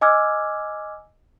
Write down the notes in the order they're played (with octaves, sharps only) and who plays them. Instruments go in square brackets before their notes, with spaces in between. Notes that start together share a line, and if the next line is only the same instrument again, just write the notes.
[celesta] D#5 G#5 D6 E6 F6 G#6